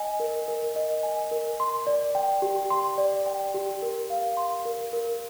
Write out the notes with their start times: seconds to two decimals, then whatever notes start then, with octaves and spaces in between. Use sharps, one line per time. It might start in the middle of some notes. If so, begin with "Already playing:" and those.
Already playing: D#5 G#5
0.20 A#4
0.48 A#4
0.76 D#5
1.03 G#5
1.31 A#4
1.60 C6
1.87 D5
2.15 G5
2.42 G4
2.70 C6
2.98 D5
3.26 G5
3.54 G4
3.82 A#4
4.10 F5
4.37 C6
4.65 A#4
4.93 A#4